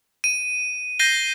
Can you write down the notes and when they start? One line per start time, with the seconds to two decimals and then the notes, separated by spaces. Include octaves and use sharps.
0.24 D#7
0.99 G6 A#6 C7 D#7 G7